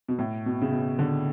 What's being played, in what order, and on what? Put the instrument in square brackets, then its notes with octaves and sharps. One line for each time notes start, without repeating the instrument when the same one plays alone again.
[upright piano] B2
A2
B2
C#3
B2
D3